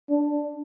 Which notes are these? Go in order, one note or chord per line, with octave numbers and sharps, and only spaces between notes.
D4